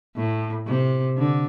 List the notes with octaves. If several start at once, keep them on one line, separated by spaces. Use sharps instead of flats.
A2
C3
D3